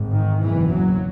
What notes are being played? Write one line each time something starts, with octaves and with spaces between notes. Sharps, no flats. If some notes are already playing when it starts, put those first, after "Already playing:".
Already playing: G#1 G#2
D#3
F#1 E2 B2 E3
F#3